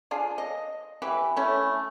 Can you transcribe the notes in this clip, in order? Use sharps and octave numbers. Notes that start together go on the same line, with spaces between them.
D4 F4 G#4
D#5
E3 G4 B4
A3 C#4 E4